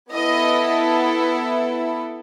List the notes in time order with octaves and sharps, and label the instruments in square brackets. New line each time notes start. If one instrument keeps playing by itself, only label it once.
[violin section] B3 E4 A4 D#5